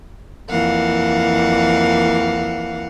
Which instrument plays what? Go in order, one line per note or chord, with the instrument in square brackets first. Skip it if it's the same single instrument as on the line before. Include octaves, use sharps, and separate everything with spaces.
[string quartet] F2 E3 A#3 F5 F#5